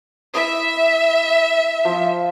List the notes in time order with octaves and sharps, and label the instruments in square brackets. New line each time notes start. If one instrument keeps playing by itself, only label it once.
[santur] E4 D#6 [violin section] E5
[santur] F3 F4